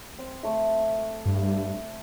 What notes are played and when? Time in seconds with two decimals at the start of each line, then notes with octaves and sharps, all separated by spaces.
0.19 C4
0.43 A3 E5
1.26 G2